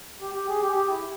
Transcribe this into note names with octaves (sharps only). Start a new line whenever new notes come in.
G4
G4
G#4
G4
G4
E4